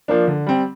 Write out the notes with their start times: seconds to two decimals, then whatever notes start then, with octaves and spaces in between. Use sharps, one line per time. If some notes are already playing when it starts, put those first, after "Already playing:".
0.08 F3 A#3 D4
0.28 D3
0.47 G3 C4